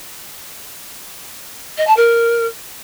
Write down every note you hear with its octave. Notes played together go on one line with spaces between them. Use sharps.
D#5
A5
A#4